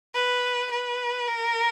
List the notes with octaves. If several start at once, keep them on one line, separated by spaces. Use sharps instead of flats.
B4
B4
A#4